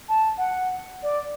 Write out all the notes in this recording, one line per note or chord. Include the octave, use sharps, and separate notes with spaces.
A5
F#5
D5